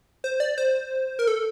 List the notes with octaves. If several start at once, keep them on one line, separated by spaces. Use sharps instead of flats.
C5
D5
C5
A#4
A4